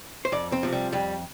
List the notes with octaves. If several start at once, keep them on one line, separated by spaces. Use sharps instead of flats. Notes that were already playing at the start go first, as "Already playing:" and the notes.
C5
F2 D5
C4
C3 F3
G3
F2 G3